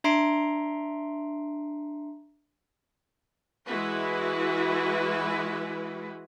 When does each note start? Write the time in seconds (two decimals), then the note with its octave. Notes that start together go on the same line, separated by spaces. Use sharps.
0.04 D4 E5 A#5 C6 C7 D7
3.66 E3 G#3 E4 F#4 B4